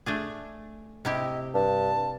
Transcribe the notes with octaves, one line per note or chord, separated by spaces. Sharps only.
A3 D4 G#4
C3 E4 G4 D#5
G2 A5